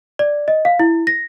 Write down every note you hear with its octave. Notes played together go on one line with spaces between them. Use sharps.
D5
D#5
F5
E4
A#6